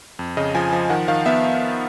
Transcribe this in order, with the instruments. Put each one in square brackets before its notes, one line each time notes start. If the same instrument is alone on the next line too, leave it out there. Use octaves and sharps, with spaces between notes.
[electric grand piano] F2
C#3 D#5
F3 G#5
F3
D#3 F#5
D#3 F5
B3 E5